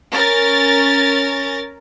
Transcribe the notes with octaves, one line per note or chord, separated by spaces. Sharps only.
C#4 A#4 A6